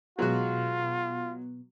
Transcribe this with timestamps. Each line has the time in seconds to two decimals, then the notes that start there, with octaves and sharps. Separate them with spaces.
0.19 B2 F#3 G#3 B3 F4 F#4